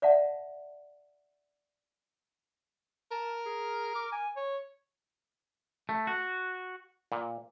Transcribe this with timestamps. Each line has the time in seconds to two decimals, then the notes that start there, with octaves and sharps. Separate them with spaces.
0.02 D5 E5 F#5 A5
3.11 A#4 A5
3.46 G#4
3.95 D6
4.12 G#5
4.36 C#5
5.89 A3
6.07 F#4
7.12 A#2